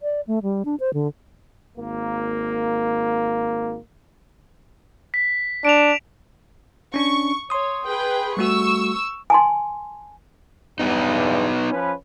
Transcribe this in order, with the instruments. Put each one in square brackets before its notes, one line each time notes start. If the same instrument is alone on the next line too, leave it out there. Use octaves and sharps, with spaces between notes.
[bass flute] D5
A3
G3
D4
C5
D3
[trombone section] G#1 A#3
[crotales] B6
[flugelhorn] D4 [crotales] D7 E7 F7
[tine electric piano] C#4 D4 [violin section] C#6
[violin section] C#5 [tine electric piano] C6 D#6
[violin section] G#4 B4 G5
[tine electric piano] G3 A3 F#4 [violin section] C#6 E6
[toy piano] G#5 A5 C6
[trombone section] E2 G2 [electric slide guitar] B3 D#4
[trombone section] F3 C#4 B4